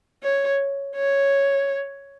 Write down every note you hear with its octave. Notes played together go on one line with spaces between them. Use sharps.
C#5
C#5